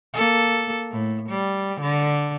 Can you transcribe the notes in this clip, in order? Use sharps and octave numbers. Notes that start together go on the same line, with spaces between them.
A#3 A4
A2
G3
D3